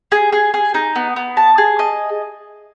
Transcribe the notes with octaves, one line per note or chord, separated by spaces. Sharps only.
G#4
G#4
G#4
D#4
B3
B3
A5
G#4
D#5